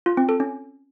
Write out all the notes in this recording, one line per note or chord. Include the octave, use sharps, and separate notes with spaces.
F4
C4
A4
C#4